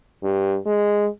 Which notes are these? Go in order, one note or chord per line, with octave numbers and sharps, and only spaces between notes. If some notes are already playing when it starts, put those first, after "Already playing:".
G2
G#3